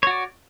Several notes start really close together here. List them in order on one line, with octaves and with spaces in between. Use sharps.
C#5 F#4 D5